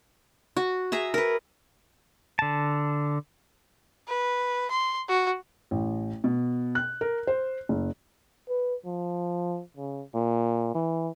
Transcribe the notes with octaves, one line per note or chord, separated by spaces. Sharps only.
F#4
G#4 E5 A#5
A#4 B4
D3 A5
B4
C6
F#4
A1
B2
F#6
A#4
C5
F#1
B4
F3
C#3
A#2
E3